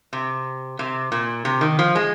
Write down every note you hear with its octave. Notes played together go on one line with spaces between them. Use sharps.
C3
C3
A#2
C3
D#3
F3
G#3